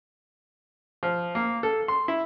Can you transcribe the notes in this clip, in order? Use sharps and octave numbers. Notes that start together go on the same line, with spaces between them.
F3
A#3
A4
C6
E4